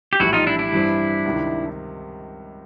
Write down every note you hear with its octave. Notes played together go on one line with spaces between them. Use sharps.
G4
A#1 A2 E3 G3 E4 F#4
D#4 F4
D4 E4
D4 E4
G2 E3 G3 C4
C#2 C3 D#3